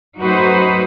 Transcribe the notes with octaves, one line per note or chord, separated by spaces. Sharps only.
F#2 A3 D#4 F#4 B4 C5